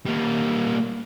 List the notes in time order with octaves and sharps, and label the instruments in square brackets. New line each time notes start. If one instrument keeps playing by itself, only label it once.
[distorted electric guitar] G3 A#3